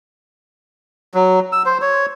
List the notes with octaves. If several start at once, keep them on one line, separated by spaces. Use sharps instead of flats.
F#3
E6
C5
C#5